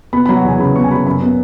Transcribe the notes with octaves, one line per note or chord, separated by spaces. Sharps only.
B3 B5
F#3 B5
F#5
E2 G#5
C#3 B5
B3 C#6
G#5
F#3 B5
F#2 B5
B3